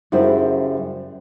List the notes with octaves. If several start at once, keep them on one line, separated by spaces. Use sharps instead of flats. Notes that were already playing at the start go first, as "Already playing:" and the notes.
F#2 C#3 G3 E4 C5